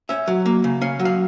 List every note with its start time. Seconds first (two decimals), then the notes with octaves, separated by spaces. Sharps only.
0.09 C#4 E5
0.27 F#3
0.46 A#3
0.64 C#3
0.81 C#4 F5
0.99 F#3
1.05 F5